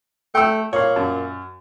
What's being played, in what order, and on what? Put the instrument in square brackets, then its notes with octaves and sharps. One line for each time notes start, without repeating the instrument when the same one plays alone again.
[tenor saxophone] A3 [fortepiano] G5 E6
[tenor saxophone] A#2 [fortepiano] C#5 F5
[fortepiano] F#2